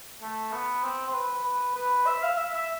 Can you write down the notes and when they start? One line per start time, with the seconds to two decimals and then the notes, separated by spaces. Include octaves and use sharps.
0.22 A3
0.52 B3
0.83 C4
1.08 C5
1.14 B4
1.45 B4
1.76 B4
2.07 E5
2.23 F5
2.38 E5
2.54 E5